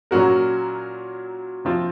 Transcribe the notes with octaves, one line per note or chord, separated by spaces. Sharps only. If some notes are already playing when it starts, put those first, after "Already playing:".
A#2 F#3 C#4 F#4 A#4
C3 F3 C4 F4